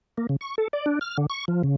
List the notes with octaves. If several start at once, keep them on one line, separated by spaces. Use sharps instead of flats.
A#3
C#3
C#6
A4
D5
D4
F6
D3
C#6
F3
C#3